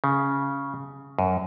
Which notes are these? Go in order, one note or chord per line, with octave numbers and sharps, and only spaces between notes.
C#3
F#2